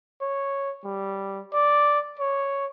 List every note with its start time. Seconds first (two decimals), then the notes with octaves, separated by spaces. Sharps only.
0.21 C#5
0.84 G3
1.54 D5
2.20 C#5